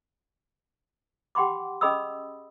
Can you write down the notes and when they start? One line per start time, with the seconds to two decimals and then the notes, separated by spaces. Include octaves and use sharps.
1.35 G4 F#5 G5 B5 C6 D6
1.81 C#4 G#4 D#5 B5 D#6 E6